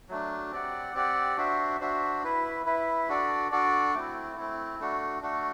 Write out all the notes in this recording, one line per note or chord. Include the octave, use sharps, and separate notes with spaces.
F#3 A3 D4
C4 G4 D5 F#5
C4 G4 D5 F#5
D4 F#4 C5 E5
D4 F#4 C5 E5
E4 B4 E5
E4 B4 E5
D4 F#4 A4 D5
D4 F#4 A4 D5
A3 C4 E4
A3 C4 E4
A3 D4 F#4 A4
A3 D4 F#4 A4